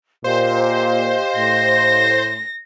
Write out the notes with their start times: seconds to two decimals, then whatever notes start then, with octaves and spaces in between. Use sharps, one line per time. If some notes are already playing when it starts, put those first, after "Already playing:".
0.24 A#2 G4 C5 D#5 F5
1.36 A2 A#6